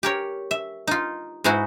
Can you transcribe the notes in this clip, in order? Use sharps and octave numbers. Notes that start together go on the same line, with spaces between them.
G4 A#4 C#5
E5
D#4 F4
G#2 G#3 D#4 E4 F#4